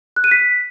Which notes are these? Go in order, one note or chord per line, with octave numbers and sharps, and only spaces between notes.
F#6
D#7
B6